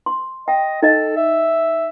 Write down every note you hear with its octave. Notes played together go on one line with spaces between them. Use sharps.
C6
D#5 G5
D#4 A4 D#5
E5